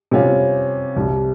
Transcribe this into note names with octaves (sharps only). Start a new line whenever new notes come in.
C3 G3 C#4 F4
C2 C3 G3